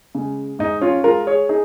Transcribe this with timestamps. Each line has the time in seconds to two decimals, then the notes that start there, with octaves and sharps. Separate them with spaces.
0.15 C#3 G#3
0.59 G#2 D#4
0.81 C#4 F4
1.04 G#3 F4 A#4
1.27 G#4 C#5
1.49 D#4 G#4